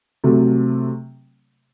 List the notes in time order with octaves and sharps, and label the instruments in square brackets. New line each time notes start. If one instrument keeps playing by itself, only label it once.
[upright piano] C3 F#3 A3